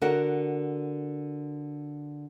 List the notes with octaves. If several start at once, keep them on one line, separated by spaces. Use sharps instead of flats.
D3 F#4 A#4 F#5